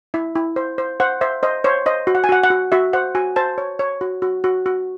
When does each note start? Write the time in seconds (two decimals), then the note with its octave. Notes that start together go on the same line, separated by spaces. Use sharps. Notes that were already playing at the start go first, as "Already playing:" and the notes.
0.14 E4 E5
0.35 E4
0.56 C5
0.78 C5
1.00 C5 F#5
1.21 C5 E5
1.43 C5 D#5
1.64 C5 C#5
1.86 C5 D#5
2.07 F#4
2.15 F#5
2.24 G#5
2.29 F#4 F#5
2.43 F#5
2.50 F#4
2.72 F#4 E5
2.93 C5 F#5
3.15 F#4 G#5
3.36 C5 A5
3.58 C#5
3.79 C#5
4.01 F#4
4.22 F#4
4.44 F#4
4.66 F#4